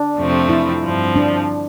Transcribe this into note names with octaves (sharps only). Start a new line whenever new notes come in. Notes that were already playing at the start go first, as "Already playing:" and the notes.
Already playing: D4
F2 C3 F3 A3 C4
E4
G2 F3 C4
D4